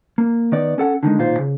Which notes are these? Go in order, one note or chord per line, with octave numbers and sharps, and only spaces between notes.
A#3
D#3 B3 D5
C#4 A4 F#5
D3 D#3 F#3 G#3
B1 A#2 D#3 F4 C5
C#3